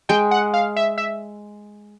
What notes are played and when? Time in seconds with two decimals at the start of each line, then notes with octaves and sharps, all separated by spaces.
0.09 G#3 G5
0.31 F#5
0.54 F5
0.76 E5
0.98 E5